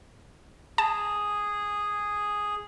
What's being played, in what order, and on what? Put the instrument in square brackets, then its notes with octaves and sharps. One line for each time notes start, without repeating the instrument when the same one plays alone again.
[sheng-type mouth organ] G#4 [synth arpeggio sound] A5